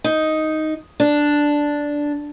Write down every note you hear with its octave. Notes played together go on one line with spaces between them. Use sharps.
D#4
D4